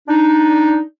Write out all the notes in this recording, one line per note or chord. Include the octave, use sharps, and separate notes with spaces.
D4 D#4